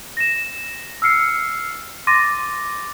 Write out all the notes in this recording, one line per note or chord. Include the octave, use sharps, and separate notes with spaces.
A#6 E7
E6 F6 C7 C#7
C6 D6 A6 A#6 D#7